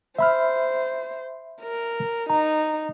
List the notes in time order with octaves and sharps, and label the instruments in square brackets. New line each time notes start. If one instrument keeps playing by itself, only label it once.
[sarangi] C5 [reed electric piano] E5 B5 F6
[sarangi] A#4
[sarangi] D#4 [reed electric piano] A#5